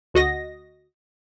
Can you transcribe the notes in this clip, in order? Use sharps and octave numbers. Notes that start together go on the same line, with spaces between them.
D2 F#4 D#5 A#6